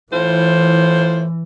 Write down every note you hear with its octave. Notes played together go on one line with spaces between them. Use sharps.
A2 E3 F4 C5